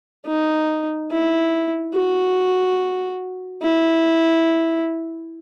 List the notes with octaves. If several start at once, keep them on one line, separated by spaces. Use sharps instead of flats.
D#4
E4
F#4
E4